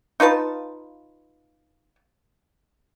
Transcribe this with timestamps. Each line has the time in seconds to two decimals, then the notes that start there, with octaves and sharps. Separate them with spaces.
0.20 D#4 F4 B4 A5